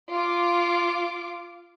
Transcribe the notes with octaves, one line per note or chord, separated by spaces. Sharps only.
F4 D6